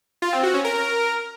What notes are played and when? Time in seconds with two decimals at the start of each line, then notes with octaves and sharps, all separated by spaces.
0.22 F4
0.33 C4
0.43 F#4
0.54 C#4
0.64 A#4